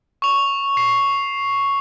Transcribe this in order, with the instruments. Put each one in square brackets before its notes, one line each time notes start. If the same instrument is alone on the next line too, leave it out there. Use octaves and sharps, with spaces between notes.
[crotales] C#6 F7
C7